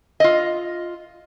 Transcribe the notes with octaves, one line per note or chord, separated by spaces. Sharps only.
F4 D#5